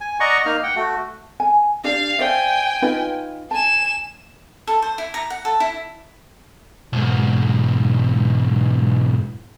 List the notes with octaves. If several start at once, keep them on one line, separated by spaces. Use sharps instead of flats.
G#5
D5 D#5 F#5 A#5 C#6
A#3 D#4 F6
F#5 G5
A3 F#4
G#5
D4 G4 D5 F5
C5 D5 E5 G5 G#5
D#4 F4 B4
G#5 A5 E7
A4
C5
E4
A#5
F#5
A4
E4
B1 G#2